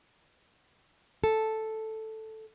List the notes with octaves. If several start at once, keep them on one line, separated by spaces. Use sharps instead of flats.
A4